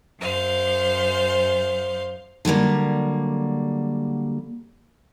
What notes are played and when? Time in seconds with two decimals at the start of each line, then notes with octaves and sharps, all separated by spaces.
0.19 F#2 C5 F5
2.45 D3 F#3 G3 A#3